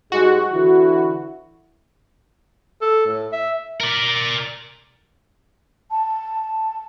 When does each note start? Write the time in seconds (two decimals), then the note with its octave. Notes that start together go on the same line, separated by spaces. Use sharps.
0.12 G#2 G3 G#3 F#4
0.52 D3 E3 E4
2.81 A4
3.06 A2
3.32 E5
3.81 A#4 D5
5.91 A5